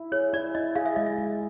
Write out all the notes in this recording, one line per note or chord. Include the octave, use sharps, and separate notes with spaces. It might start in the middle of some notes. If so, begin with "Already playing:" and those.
Already playing: E4
G#4 C#5
E4 D5
E4 D#5
G#4 F5
E5
G#3 D#5
E5
G#3